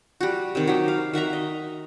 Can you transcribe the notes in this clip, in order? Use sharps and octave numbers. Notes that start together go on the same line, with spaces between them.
G3 F#4
C3 D#3
F#3 D#4 G4
F5
D#3 F#4 E5 A#5
D#5